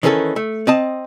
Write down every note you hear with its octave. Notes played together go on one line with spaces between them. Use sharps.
D#3 E3 A#3 C#4 G#4 A4
A3
C4 D#5 A5